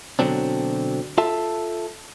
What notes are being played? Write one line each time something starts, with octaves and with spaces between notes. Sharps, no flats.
B2 D3 F#3 C4 D4
F4 A4 E5 A5